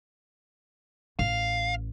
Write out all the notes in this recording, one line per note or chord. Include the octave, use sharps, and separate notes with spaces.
A1 F5